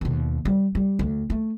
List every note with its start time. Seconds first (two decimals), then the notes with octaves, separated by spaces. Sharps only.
0.01 D#2 B2
0.45 G3
0.75 G3
0.99 D2
1.30 A3